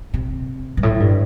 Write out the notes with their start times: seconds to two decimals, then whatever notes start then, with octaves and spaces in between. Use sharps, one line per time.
0.14 C3
0.77 G2
0.83 A2
1.00 G2